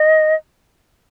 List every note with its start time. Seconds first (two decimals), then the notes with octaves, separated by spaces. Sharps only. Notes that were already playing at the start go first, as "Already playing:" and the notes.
Already playing: D#5